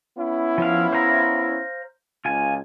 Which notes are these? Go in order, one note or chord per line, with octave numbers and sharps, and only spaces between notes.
B3 C#4 E4
F3 F5
C5 F5 A#5
C#2 F4 G#5